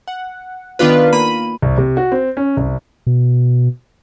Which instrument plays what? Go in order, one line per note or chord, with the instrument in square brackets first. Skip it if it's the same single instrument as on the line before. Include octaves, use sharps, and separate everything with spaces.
[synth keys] F#5
D#3 B3 D4 F4 B4
A#3 B5 D#7
[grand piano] C2
C3
F#4
C4
C#4
C2
[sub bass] B2